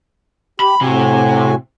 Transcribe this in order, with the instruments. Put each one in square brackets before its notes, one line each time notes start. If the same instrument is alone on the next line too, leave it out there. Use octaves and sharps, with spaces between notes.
[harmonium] G4 [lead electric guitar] B5
[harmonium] A2 F#4 G#5 [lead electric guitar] C3